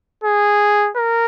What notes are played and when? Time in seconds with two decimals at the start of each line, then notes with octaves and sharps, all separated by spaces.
0.24 G#4
0.97 A#4